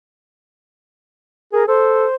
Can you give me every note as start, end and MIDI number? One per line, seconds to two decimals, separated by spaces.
1.53 1.64 68
1.53 1.64 70
1.68 2.07 69
1.68 2.15 72